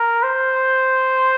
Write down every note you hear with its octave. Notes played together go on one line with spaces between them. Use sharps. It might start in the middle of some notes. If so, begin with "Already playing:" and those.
Already playing: A#4
C5